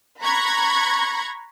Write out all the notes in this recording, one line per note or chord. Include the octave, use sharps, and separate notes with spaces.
A#5 B5 C#6 F#6 G#6 A#6